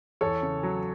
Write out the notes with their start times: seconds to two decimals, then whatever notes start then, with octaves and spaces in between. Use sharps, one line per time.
0.21 E2 A4 C#5
0.42 C#3
0.63 F#3